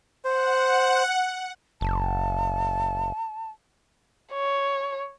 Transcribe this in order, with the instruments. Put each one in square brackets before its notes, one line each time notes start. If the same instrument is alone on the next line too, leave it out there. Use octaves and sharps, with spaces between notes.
[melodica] C5 [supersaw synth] F#5
[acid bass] F#1 [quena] A5
[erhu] C#5